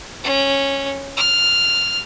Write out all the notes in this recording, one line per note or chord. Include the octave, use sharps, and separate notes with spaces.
C#4
F6